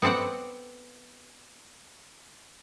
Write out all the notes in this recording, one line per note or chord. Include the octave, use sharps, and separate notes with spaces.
B3 C4 A4 D5 F#5